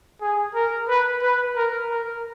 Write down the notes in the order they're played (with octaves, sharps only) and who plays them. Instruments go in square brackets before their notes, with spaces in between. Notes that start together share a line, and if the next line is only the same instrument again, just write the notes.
[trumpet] G#4
A#4
B4
B4
A#4
A#4